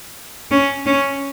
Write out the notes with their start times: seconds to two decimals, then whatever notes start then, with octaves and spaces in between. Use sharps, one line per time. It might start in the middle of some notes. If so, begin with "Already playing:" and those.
0.51 C#4
0.86 C#4